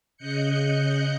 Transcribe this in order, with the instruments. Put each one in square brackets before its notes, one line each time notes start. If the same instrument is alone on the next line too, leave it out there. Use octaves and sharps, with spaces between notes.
[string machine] C#3 D#5 F#6 G6 C#7